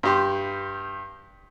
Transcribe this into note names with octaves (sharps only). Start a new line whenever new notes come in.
G2 G4 C6